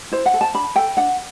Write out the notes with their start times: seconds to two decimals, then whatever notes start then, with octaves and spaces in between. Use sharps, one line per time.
0.12 E4 C5
0.26 F#5
0.34 A4
0.41 A5
0.54 D4 B5
0.76 A4 G5
0.97 D4 F#5